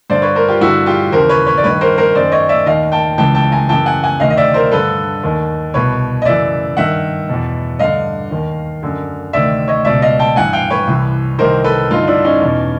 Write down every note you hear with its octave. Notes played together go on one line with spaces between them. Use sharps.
G2 D3 C5 D5
B4 C#5
A#4 C5
F4 G4
G2 D3 E4 F#4
F4 G4
D#2 C#3 E3 A#4 C5
B4 C#5
B4 C#5
D5
G2 D#3 B4 C#5
A#4 C5
A#4 C5
F#2 D#3 C5 D5
C#5 D#5
D5 E5
D#2 D#3 D#5 F5
G5 A5
C#2 C#3 E3 G5 A5
G5 A5
G#5 A#5
F#2 C#3 E3 G5 A5
F#5 G#5
F#5 G#5
D2 C3 D#3 D#5 F5
D#5
D5 E5
A#4 C5
G2 D3 A4 B4
D#2 D#3
C2 B2 B4 C#5
D#5
F#2 C#3 E3 D5 E5
G2 D#3 E5 F#5
E2 B2
G2 D3 D#5 F5
D#2 D#3
F#2 D3
D2 C3 D#3 D5 E5
C#5 D#5
C#2 B2 D5 E5
D#5 F5
G5 A5
G2 E3 F#5 G#5
F5 G5
B4 C#5
C2 C3 E3
C2 C3 D#3 A#4 C5
A4 B4
G2 D3 D#4 F4
D4 E4
C#4 D#4
E2 B2